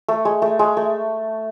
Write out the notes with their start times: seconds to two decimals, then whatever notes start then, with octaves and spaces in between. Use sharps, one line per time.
0.08 A3
0.25 G#3
0.42 A3
0.59 G#3
0.77 A3